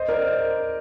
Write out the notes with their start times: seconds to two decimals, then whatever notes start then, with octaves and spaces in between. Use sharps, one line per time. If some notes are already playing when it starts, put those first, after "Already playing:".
Already playing: C5 D#5
0.08 A#4 D5